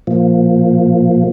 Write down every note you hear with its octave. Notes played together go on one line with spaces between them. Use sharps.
A#2 F3